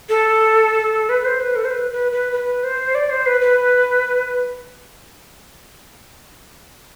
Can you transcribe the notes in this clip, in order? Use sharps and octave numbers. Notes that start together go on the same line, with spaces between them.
A4
B4
C5
B4
A4
C5
B4
B4
B4
B4
C5
D5
C5
B4
B4